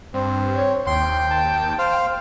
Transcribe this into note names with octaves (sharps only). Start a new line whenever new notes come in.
G2 C4
C#5
D#2 G5 C6
A5
C5 F5